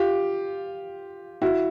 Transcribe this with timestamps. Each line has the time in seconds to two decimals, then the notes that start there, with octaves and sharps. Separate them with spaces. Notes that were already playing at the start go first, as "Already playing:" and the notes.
Already playing: F4 G4
1.42 E4 F#4